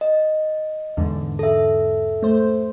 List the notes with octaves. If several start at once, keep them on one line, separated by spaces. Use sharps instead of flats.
D#5
E2 G#2 D3
A4 E5
A3 C5